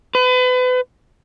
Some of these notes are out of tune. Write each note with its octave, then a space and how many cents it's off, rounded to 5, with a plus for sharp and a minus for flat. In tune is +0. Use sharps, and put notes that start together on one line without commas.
B4 +35